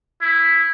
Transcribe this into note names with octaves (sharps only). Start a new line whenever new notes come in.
E4